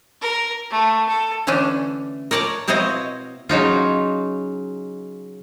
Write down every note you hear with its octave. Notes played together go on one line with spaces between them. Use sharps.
A#4
A3
A4
D3 E3 A3 C#4 D4
A#4 C#5 D5 A5 A#5
B2 C4 E4 C#5 D#5 F5
C#3 F#3 D#4 F4